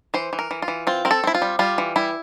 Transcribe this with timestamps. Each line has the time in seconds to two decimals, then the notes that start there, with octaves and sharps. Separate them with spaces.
0.14 E3 C5
0.33 E3
0.39 A#4
0.51 E3
0.62 F4
0.68 E3
0.87 C4 F4
1.05 C4 A#4
1.11 A4
1.24 C4 E4
1.35 F4
1.42 G3
1.59 G3 F4
1.78 E3
1.96 G3 E4